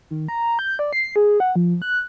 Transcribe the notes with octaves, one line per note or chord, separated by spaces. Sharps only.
D#3
A#5
G6
D5
C7
G#4
F#5
F3
F#6